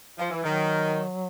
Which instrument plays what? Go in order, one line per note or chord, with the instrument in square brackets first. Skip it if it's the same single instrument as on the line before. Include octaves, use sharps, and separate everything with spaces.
[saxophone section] F3
E3
[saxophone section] D#3 [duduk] F#3